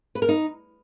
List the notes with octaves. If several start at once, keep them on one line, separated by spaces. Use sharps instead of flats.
B4
A#4
D#4